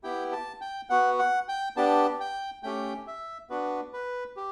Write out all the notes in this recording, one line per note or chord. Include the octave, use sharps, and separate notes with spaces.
B3 E4 G4 G5
A5
G5
B3 F#4 F#5
F#5
G5
B3 D4 G4 A5
G5
A3 C#4 G4 G5
E5
B3 D4 F#4 B4
B4
G4